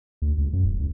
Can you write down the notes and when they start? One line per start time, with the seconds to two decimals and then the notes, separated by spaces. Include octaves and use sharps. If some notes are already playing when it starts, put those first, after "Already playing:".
0.22 D2
0.38 C#2
0.53 F#2
0.65 D1
0.80 C#2